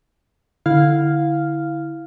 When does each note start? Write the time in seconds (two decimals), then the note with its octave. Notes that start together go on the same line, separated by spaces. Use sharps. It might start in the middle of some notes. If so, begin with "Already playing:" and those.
0.66 D3 E4 F5 F6